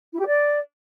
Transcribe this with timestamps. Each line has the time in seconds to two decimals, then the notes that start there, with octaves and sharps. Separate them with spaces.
0.13 E4
0.20 G4
0.27 D5